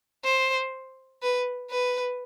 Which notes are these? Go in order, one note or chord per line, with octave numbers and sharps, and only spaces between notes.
C5
B4
B4